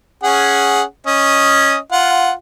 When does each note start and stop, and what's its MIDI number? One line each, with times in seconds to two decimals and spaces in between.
0.23 0.82 61
0.23 0.82 68
0.23 0.82 78
1.07 1.76 61
1.07 1.76 75
1.92 2.31 65
1.92 2.31 78